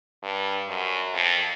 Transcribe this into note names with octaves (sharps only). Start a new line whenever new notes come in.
G2
F#2
F2